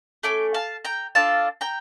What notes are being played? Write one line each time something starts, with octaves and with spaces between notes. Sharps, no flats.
A3 C#4 D6
F5 A5
G5 A#5
D4 F4 A4 F5 A5
G5 A#5